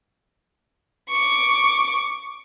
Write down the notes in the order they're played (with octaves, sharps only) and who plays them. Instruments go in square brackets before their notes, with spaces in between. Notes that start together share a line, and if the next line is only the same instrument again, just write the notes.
[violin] C#6 D6